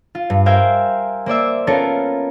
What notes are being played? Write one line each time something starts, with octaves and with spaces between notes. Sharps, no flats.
F4
G2
A#4 C5 E5 F5 G5 G#5
A#3 C5 D5 E5
B3 C#4 F4 A4 A#4 C#5